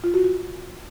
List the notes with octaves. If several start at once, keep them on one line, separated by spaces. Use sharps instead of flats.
F4
F#4
F#4